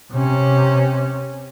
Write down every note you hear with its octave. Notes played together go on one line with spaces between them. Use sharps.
C3 C#4